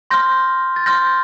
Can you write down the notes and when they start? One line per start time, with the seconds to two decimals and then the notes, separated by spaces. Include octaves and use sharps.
0.10 C6 F6 G6 A#6
0.76 A6
0.86 C6 F6 G6 A#6